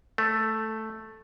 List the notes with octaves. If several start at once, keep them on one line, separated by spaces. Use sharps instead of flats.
A3